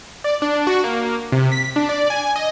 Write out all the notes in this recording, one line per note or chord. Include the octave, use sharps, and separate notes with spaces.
D5
D4
F#4
A#3
C3
B6
D4
D5
G#5
D#5